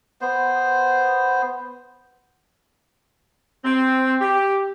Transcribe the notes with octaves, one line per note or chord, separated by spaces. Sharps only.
B3 C5
C4
G4